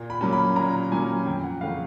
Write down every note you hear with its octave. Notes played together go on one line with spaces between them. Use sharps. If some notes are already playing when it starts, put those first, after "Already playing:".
Already playing: A#2
B5
F#3 A#3 C#4
B5
A#2 A#5
F#3 A#3 C#4 G#5
F2 G5
F#5
C#3 E3 A3 C4 F5